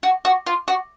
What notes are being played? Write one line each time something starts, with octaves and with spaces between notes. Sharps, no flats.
F#4
F#4
F4
F#4